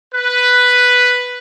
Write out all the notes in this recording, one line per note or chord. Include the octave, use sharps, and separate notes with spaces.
B4